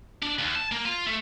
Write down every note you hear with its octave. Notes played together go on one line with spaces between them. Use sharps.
D4
D#2
A5
A#3
F4
A3